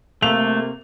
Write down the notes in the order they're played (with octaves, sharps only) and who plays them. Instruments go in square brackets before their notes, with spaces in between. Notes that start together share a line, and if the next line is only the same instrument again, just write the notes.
[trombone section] C3 A#3 [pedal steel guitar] A3 [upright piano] F7